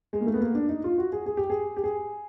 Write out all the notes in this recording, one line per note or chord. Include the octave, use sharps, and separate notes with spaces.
G#3
A#3
A3
B3
A#3
D4
D#4
F4
F#4
G#4
G#4
G4
G#4
G4
G#4